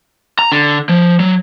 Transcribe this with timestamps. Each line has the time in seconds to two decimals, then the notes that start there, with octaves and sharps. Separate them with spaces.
0.39 A#5
0.52 D3
0.89 F3
1.20 F#3